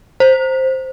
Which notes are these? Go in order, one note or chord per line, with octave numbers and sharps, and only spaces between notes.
C5